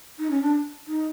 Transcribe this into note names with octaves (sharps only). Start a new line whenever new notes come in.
D#4
C#4
D4
D#4